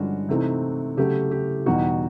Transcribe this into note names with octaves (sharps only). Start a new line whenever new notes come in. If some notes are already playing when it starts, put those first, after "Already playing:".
Already playing: G2 D3 F3 G#3 C#4 F#4
C3 E3 A3 C4 D#4
C#3 F#3 A3 G4
G4
E2 B2 G3 B3 D#4 F#4